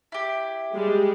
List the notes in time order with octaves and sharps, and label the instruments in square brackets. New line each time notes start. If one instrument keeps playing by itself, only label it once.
[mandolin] E4 G4
[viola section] G3 G#3